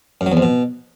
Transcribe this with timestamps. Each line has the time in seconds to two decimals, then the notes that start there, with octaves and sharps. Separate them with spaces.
0.21 F#2
0.26 F#3
0.32 E2
0.37 F2
0.42 B2